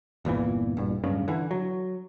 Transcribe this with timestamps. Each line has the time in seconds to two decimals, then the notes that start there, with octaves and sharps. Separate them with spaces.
0.25 G1 E2 A#2 E3
0.77 A#1 G2
1.04 D1 G2 C#3
1.28 D3 E3
1.51 F#3